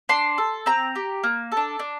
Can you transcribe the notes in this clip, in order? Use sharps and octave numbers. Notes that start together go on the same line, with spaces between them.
D4 C6
A4
C4 A#5
G4
A#3
A4
D4
D4